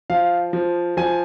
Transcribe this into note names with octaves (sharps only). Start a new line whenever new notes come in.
F3 F5
F3
F3 G#5